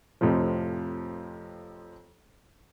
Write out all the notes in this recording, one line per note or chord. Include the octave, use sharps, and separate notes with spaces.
F2 A2 C3 F3